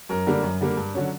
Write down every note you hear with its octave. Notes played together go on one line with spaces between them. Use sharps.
F#2 A#4
D3 G3 A#3
F#2
D3 G3 A#3
G2
D3 F#3 C#4